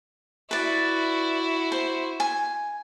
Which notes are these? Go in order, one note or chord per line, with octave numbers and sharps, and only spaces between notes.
E4 F#4 B4 D5
C5
G#5